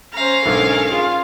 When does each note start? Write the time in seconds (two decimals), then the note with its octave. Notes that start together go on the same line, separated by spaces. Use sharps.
0.14 C#4 C5 F5 A#5
0.45 B1 G#2 D3 A4 A#4
0.92 F4 G#4